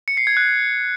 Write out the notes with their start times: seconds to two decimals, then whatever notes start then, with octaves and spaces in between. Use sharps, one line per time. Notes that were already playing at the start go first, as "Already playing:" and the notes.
0.08 C#7
0.17 C7
0.27 G#6
0.37 F#6